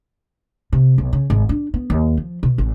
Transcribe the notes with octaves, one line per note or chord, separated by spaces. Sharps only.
C3
B1
C#3
G#1
D4
B3
D#2
F3
B2
A1